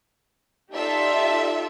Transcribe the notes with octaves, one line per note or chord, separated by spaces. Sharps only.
D#4 F4 G4 A4 D5 E5